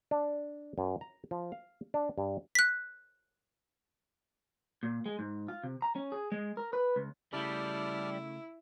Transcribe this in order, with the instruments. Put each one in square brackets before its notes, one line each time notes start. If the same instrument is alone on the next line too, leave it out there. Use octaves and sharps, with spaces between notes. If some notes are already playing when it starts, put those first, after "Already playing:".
[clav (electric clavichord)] D4
F#2
A#5
F3
F5
D4
G2
[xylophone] F#6 B6
[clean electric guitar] A#2
G#3
G#2
F4
C3
A#5
C#4
G#4
G#3
A#4
B4
C#2
[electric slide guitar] C#3 A3 [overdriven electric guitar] G3 [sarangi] E4 [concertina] A5 D6 F6